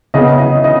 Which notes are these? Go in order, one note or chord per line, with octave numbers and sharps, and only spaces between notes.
C#3 B3 D#5
D#5
D#5